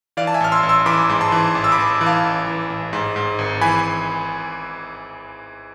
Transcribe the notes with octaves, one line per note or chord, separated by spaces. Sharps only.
E3 D5 F5
A5
E5 G#5
A1 F6
C6 E6
A1
C6 E6
E3 B5 D6
G#2
A5 C6
E3
A1
E6
B5 D6
A1
E3
F5 A5
A1
E3
A1
G#2
G#2
G#1
E3 G#5 B5